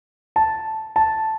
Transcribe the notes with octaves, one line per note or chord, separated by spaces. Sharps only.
A5
A5